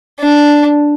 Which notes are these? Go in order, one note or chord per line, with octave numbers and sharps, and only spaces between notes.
D4